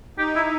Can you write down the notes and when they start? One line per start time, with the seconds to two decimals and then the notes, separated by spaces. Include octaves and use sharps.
0.18 D#4 G4
0.36 E4